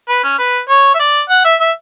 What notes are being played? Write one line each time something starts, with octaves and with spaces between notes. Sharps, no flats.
B4
C#4
B4
C#5
E5
D5
F#5
E5
E5